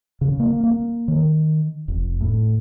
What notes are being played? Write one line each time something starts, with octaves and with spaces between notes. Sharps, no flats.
C#3
A#3
A#3
D#3
F1
A2